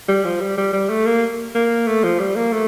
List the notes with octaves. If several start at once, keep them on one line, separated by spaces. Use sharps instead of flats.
G3
F3
G3
G3
G3
A3
A#3
A#3
A3
F3
G3
A#3
A3